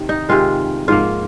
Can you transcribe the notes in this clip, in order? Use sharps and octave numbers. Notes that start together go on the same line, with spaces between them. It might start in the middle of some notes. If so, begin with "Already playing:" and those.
Already playing: C3 D#3
D#4
C3 D#3 G#3 F4
G#2 F3 A#3 F4